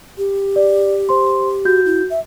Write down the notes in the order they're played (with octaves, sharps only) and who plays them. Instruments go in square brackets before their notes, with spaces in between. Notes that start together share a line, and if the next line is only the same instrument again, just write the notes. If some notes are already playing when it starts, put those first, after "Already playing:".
[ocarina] G4
[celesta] D5
C5 C6
F#4 G6
[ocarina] E4
E5